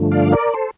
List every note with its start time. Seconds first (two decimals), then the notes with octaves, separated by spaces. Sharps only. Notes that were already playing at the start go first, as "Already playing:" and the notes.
Already playing: G2 D3 F3 A3
0.11 D5 F5
0.32 A#4 D5
0.54 A4 C5